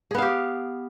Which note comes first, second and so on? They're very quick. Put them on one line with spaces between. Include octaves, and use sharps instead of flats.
G#4 B3 F5 G4